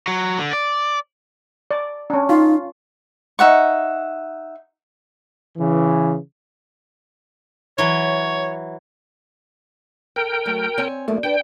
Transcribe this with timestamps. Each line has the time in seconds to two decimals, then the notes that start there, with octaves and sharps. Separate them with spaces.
0.08 F#3
0.39 D3
0.53 D5
1.71 D5
2.10 C#4 D4
2.29 D#4 F4
3.39 D#4 E5 F#5 C#6
5.58 C#3 E3
7.78 E3 F#3 C#5
10.16 A4 A#4 G5
10.46 F#3 A3
10.78 C4 C#5 G#5
11.08 F#2 A3 A#3 D4
11.23 D4 B4 G5